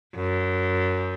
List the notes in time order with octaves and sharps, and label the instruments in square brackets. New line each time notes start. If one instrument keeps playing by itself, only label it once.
[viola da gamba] F#2